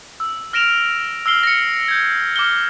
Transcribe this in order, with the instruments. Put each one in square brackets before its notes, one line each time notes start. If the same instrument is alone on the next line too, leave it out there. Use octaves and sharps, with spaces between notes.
[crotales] E6
F6 A#6 D7 E7 F7
E6 F6 C7 G7
A#6 C#7
G6 G#6
D6 F6 G7